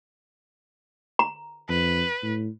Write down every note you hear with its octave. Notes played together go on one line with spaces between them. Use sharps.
A#5
F2 B4
A2